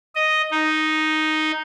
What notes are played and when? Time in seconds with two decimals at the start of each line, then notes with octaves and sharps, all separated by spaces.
0.15 D#5
0.51 D#4